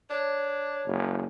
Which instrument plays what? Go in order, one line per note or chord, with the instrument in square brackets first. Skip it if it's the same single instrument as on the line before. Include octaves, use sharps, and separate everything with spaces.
[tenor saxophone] D4 [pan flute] C#5
[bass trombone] F#1